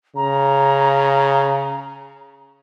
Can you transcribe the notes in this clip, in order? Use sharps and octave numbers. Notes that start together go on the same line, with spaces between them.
C#3 A#5